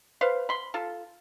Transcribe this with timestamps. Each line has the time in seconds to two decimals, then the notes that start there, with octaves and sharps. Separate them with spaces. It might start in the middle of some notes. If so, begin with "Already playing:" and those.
0.21 B4 C5 F5
0.49 B5 C6
0.74 F4 A4